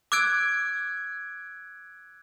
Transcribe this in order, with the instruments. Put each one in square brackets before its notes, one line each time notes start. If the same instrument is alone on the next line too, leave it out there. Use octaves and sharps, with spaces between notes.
[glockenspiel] D6 E6 F#6 G#6 D7